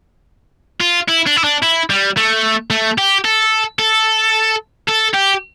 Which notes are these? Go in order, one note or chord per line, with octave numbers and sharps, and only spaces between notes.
F4
E4
D4
E4
D4
E4
G3
A3
A3
G4
A4
A4
A4
G4